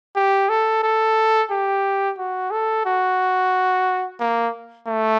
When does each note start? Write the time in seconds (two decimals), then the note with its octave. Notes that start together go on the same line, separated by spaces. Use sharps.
0.16 G4
0.49 A4
0.83 A4
1.50 G4
2.18 F#4
2.51 A4
2.86 F#4
4.20 A#3
4.87 A3